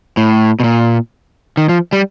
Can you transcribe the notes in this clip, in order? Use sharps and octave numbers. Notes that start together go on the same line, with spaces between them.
A2
B2
A#2
D#3
F3
G3